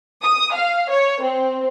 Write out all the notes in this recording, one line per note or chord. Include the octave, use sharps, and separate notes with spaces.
D#6
F5
C#5
C4